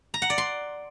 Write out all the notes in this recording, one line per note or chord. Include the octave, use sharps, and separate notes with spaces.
A#5
F#5
D5
C6